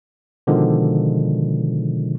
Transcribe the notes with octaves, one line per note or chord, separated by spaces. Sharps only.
B2 D3 D#3 F3 G#3